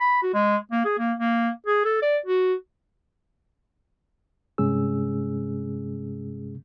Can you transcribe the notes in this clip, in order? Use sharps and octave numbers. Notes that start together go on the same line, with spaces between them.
B5
F#4
G#3
A#3
G#4
A#3
A#3
G#4
A4
D5
F#4
G2 C3 G#3 C#4 G#4 E6